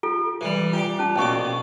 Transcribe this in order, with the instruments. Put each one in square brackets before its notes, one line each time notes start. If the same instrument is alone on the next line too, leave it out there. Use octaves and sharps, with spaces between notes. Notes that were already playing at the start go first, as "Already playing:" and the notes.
[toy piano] F4 A4
[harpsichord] E3 G3
[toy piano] F4 [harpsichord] G4 G5
[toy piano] C#4 F4 A5
[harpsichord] A#1 B2 D6 [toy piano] C#4 C#6